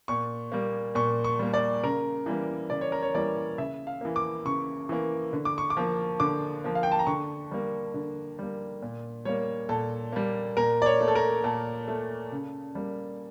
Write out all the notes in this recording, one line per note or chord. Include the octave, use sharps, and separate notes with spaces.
A#2 C#6
G3 A#3
A#2 C#6
C#6
G3 A#3
D5
C#3 A#4
E3 G3 A#3
C#3 D5
C#5
A#4
C#5
E3 G3 A#3 D5
C#3 E5
F5
E3 A#3
D6
C#3 C#6
E3 A#3
D3
D6
C#6
D6
F3 A#3
D3 D6
F3 A#3
F5
G5
A5
A#5
D3 C#6
G3 A#3
D3
G3 A#3
A#2
G3 A#3 C#5
A#2 A4
G3 A#3
A#2 A#4
D5
C#5
A3
A4
A#4
A#2 A4
A3
C#3
G3 A#3